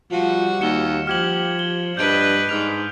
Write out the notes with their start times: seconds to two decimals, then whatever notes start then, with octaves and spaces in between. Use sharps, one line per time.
0.12 F3 G3 F#4
0.61 D#2 C#7 E7 G7
1.07 F3 G4 F6 G#6 F#7
1.59 G7
1.97 G2 D4 B4 D#5 G6 D7
2.49 G#2 F6 F7